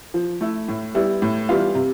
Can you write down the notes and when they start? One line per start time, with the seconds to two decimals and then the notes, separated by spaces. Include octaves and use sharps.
0.14 F3
0.41 A3 E4
0.68 A2
0.94 G3 B3 E4
1.22 A2
1.49 E3 G3 B3 F4
1.75 C3